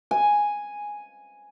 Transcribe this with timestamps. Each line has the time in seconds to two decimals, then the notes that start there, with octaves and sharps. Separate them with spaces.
0.11 G#5